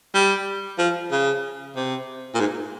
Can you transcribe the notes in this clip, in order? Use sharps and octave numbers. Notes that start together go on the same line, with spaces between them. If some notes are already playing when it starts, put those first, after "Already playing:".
G3
F3
C#3
C3
A#2
G#2